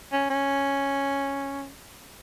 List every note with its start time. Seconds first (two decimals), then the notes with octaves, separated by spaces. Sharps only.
0.12 C#4
0.30 C#4